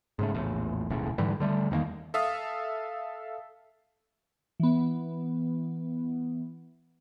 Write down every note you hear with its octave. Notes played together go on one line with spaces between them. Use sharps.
G#2 C#3 A3
A#1 E2 A2
D#1 B1 A2 C#3
G#2 D3 E3 G3
D3 G3 A3
E2 G2 D#3 A#3
A4 E5 F5 D#6
E3 B3